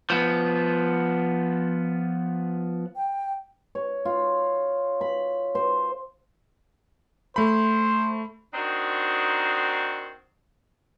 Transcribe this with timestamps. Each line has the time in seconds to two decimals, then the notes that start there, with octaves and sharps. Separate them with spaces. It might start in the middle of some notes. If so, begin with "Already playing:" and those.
0.10 F3 B3
2.96 G5
3.75 C#5
4.05 F4
5.01 B5
5.55 C5
7.36 A3 C5 B5
8.54 D#3 C4 D4 D#4 F#4 C5